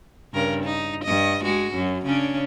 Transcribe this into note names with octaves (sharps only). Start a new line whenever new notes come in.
G2 C#3 A#4
D#4
G2 D#5
G#3 F#4
F#2
C#3 C#4 D4